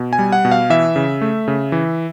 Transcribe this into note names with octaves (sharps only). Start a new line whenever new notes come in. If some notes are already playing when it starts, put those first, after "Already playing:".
Already playing: B2
G#5
G3
F#5
B2
F5
E3 E5
C#3
A3
C#3
E3